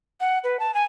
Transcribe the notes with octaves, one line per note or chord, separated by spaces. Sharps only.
F#5
B4
A5
G#5